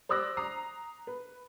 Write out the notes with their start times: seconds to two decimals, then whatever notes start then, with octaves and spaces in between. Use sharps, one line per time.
0.09 C5 D5 D6 E6 F#6 A#6
0.37 A#5 D#6 C7
1.07 B4